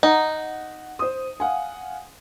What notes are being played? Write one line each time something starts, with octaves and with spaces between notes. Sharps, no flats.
D#4 F#5
C5 D#6
F5 F#5 G#5